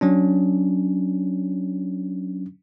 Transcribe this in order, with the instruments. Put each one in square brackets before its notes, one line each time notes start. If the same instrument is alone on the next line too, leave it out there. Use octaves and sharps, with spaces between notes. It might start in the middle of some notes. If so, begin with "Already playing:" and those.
[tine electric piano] F#3 C#4 D4